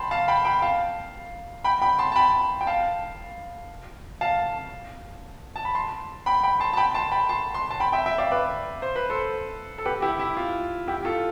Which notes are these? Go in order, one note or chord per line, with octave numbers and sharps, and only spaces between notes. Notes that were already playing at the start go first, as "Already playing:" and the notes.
Already playing: G5 A5 B5 C6
F5 A5
G5 B5
G5 B5
F5 A5
G5 B5
G5 B5
A5 C6
A5
G5 B5
G5
F5 A5
F5 A5
A5
B5
A5 C6
G5 B5
G5 B5
A5 C6
A5
G5 B5
A5 C6
G5 B5
A5 C6
C6
A5 C6
G5 B5
E5 G5
E5 G5
D5 F5
B4 D5
C5
B4
A4 C5
A4
G4 B4
E4 G4
E4
F4
E4 G4
F4 A4